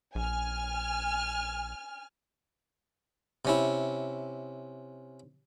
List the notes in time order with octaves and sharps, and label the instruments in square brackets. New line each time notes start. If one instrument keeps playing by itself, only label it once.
[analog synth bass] A#1 [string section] G#5 F6
[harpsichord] C3 C#4 E4